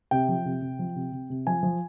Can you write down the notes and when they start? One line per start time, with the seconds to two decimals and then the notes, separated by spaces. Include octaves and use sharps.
0.11 C3 G5
0.29 F3
0.45 C3
0.62 C3
0.79 F3
0.96 C3
1.12 C3
1.30 C3
1.47 F3 G#5
1.63 F3